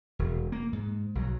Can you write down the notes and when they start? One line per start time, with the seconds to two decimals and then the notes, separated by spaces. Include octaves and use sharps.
0.19 E1
0.52 A#3
0.73 G#2
1.15 B1 F#3